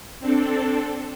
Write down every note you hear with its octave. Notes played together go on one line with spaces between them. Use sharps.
C4 D4 A4